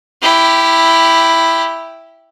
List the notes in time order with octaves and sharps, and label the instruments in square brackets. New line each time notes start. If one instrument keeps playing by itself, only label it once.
[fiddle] E4 G4